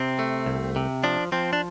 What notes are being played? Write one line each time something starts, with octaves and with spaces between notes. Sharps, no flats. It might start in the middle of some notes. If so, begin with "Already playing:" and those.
Already playing: C3 C4
A3
C2
C3
F3 D4
F3 C4
D4